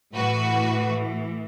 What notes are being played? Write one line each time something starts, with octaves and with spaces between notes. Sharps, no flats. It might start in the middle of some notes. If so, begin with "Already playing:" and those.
A2 E3 F#4 B4